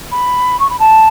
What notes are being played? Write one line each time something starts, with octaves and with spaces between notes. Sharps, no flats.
B5
C#6
B5
A5